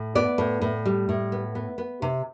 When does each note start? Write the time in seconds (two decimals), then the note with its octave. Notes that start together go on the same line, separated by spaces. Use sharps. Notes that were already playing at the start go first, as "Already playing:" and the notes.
Already playing: A2
0.15 B3 D5
0.38 A2
0.62 A2
0.86 G3
1.09 A2
1.32 B3
1.55 B3
1.78 B3
2.02 C3